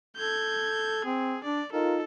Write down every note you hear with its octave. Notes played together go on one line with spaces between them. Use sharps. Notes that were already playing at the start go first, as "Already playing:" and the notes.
A4 G6 G#6
C4 G#4
D4 D5
D#4 F4 A4 A#4